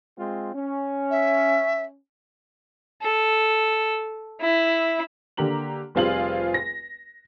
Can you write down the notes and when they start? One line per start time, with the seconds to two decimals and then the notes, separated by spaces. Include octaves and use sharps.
0.18 G#3 C4 F4
0.54 C#4
1.11 E5
3.02 A4
4.41 E4
5.37 D3 A#3 G4 A#5 F#7
5.95 F1 G3 C4 F4 G#4 F#7
6.54 A#6